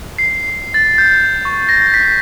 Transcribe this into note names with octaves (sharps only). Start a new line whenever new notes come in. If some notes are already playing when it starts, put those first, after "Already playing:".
C7
A6
G6
C#6
A#6
B6